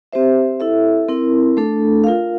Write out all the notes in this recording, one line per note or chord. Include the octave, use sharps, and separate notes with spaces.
C4 G4 C5 E5
E4 A4 E5
C4 E4 A#4
A3 D4 A4
F4 A#4 F5